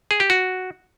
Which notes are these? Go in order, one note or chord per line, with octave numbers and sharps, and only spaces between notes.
G#4
G4
F#4